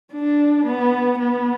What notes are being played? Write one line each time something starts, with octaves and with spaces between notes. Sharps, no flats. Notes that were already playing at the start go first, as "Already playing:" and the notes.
D4
B3
B3